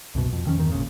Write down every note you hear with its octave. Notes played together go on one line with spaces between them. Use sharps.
C2 F#2 B2
F2
F2 D#3 F3 C#4
E2 G2 D#3
G#1 A#2 C#3